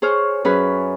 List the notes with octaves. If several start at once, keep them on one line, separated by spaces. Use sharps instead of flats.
G#4 C5 C#5 F6
F#2 C#4 G#4 B4 B5 F#6